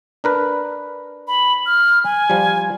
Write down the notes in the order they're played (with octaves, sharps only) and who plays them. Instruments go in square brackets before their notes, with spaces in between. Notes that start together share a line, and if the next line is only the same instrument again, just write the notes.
[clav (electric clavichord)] D4 A#4 B4
[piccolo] B5
F6
G#5
[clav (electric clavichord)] F3 G3